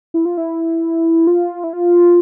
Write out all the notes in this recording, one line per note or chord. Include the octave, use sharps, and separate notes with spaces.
E4
F4
E4
F4
E4
F4